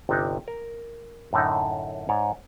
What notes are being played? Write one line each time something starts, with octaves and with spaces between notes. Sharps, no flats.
G1 C3 D4 D#4
A#4
F#2 A2 D3 A3 D#4
G#2 C#5 D5